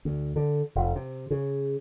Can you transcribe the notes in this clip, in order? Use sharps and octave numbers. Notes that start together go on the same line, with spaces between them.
D2
D3
F1
C3
C#3